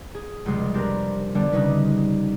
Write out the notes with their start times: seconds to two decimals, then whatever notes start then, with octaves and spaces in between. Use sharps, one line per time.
0.15 G#4
0.46 F1 C#2 G3 G#3 C6
0.74 C4 D4 G4 A#4 B4
1.35 D3 G3 B3 D4
1.52 C#3 G3 C#4 D#4 B4